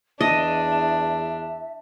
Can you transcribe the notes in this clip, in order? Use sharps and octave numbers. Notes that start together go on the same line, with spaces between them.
E2 D4 D#5 E5